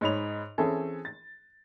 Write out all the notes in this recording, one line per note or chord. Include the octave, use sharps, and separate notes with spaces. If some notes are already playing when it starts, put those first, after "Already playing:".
G#2 D#4 C#5 B5 F7
E3 C4 C#4 G#4 A4
A6